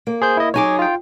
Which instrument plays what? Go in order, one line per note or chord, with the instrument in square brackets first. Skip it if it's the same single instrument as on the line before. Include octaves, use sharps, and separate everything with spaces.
[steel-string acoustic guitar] A#3
[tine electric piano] G#4 C5 G6
E4 D#5
[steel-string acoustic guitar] F#3 D#4 G#4 [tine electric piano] C#5 G#5 D6
[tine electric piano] F4 G5